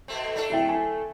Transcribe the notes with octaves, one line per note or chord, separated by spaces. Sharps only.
B2 A3 C4
A3 D4 A4
D1 E4 G5
G#5